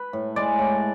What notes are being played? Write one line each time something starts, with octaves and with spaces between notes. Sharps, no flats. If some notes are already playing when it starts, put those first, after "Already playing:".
Already playing: B4
A2
G#3 D5
A2